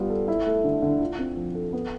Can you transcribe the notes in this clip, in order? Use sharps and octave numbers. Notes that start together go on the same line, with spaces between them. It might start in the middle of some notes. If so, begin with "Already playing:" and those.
Already playing: G3 B3 F4
A4
E4
A3
D3
D3
F4
C4
F3
A4
B3